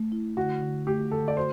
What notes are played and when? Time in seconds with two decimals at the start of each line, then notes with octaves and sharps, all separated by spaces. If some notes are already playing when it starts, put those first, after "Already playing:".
Already playing: A3
0.12 E4
0.37 D3 F#4
0.62 D3
0.87 A3 G4
1.11 D3 A4
1.28 D5
1.37 F#4 C5